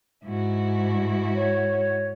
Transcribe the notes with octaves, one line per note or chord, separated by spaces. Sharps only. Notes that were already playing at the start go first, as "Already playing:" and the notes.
G#2 E4 F#4
C#5